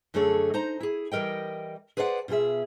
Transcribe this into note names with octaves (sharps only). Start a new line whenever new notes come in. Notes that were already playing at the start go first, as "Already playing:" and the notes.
F#2 D3 A3 G#4 C#5
D#4 C5 A#5
E4 G#4
E3 G3 A#4 D#5 G5
G#4 B4 C5 D5 F5 F#5
B2 F4 F#4 G#4 E5